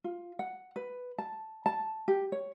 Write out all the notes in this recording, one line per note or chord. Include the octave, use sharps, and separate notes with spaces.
F4
F#5
B4
A5
A5
G4
C#5